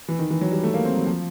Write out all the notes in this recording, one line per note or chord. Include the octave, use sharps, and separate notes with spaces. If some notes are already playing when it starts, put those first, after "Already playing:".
E3
D#3
E3
F#3
G3
A3
A#3
C4
F#3
F3